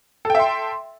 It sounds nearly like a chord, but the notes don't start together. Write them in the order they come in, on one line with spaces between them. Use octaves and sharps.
A4 G5 E5 C6